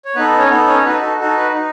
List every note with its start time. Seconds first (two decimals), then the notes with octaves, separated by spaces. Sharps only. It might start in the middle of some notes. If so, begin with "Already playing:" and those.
0.05 C#5
0.16 B3 D#4 A4 B4
0.38 C#4 C#5
0.50 B3 D#4 A4
0.67 C#4 C#5
0.85 D#4 F#4 A4 B4
1.02 A4
1.19 D#4 F#4 A4
1.37 B4
1.54 D#4